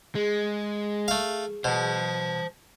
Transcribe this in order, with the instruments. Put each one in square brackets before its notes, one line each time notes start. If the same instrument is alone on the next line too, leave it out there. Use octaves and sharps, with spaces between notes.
[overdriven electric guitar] G#3 [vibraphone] G#4
[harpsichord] A3 F5
[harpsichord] B2 [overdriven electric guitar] C5 A5